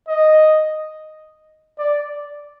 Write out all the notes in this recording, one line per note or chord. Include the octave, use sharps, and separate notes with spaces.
D#5
D5